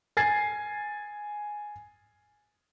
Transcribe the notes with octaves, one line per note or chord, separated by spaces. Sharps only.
G#5 G#6 A6 C7